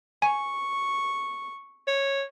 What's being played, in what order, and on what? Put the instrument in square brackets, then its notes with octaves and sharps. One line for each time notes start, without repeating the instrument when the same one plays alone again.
[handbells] G#5 [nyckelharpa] C#6
[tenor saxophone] C#5